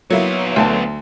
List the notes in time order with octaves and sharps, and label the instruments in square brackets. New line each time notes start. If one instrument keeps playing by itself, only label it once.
[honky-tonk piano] F#3 A#3 E4 [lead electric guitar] B3 C#5
[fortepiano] D2 A4 A5